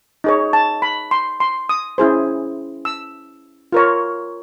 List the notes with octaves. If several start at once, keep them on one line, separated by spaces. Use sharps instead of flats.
D#4 G#4 C#5
A5
B5
C6
C6
D#6
C#4 E4 G#4 C5
E6
F4 A#4 C#5